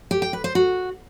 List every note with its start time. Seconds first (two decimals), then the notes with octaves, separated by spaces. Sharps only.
0.11 G4
0.22 G5
0.33 B4
0.44 C5
0.55 F#4